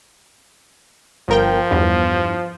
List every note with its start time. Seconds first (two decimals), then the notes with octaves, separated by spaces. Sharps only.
1.29 G1 F3 A#4 G5
1.71 E2 G2